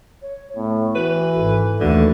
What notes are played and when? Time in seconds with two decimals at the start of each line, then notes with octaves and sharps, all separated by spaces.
0.22 C#5
0.56 A2 B3
0.95 E3 F#4 B4
1.36 G#1 A4
1.80 D#2 D3 E3 A3 F#4